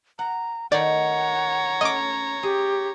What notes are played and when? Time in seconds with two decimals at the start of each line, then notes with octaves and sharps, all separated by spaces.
0.19 F#5 A#5
0.72 D#3 A3 C#5 D5 F#5 A#5
1.81 A3 C#4 D#5 D6
2.43 G4 G#4